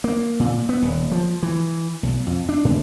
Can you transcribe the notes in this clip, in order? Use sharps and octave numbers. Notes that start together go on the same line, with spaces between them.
A#3
A#2
B3
D#1
F3
E3
B1
F2
D4
G#2